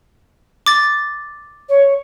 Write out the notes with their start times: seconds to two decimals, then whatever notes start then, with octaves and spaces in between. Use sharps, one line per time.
0.66 D6 A6
1.68 C#5